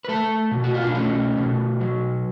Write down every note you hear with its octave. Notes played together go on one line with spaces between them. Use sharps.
B4
A3 A4
B2
F#4
F4
D4
A3 C#4
B2
F#3